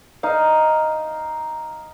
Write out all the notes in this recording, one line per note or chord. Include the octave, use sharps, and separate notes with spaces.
D#4 F5